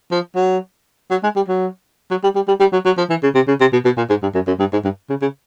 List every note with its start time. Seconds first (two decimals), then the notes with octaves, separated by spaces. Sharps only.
0.11 F3
0.35 F#3
1.11 F#3
1.23 G#3
1.36 G3
1.48 F#3
2.11 F#3
2.23 G3
2.35 G3
2.48 G3
2.60 G3
2.72 F#3
2.86 F#3
2.98 F3
3.10 E3
3.23 C#3
3.35 C3
3.48 C#3
3.60 C3
3.73 B2
3.85 B2
3.97 A#2
4.10 G#2
4.22 G2
4.35 F#2
4.47 F#2
4.59 G2
4.73 G#2
4.84 G2
5.09 C#3
5.22 C#3